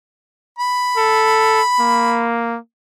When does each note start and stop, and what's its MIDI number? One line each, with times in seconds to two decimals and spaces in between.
0.59 2.27 83
0.97 1.61 69
1.80 2.58 58